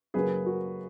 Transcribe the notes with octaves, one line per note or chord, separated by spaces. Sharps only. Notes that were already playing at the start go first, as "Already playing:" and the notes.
F#2 C#3 F#3 A#3 G#4 B4
F#4 A#4